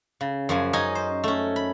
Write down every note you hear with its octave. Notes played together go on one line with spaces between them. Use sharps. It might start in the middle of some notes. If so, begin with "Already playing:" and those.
C#3
F#2 F3 G#5
C#4 D#4 D#5 G#5
C5
A3 C#4
B5